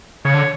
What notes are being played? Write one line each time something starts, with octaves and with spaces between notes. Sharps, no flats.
C#3 C#5
D3